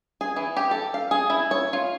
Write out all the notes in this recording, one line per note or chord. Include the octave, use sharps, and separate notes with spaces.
G#4
E3
G4
A4
F5
G#4
E4
C#5
F4